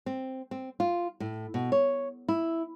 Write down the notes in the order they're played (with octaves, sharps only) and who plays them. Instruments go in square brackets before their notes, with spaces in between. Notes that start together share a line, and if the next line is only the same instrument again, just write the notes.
[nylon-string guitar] C4
C4
F4
A2
B2
C#5
E4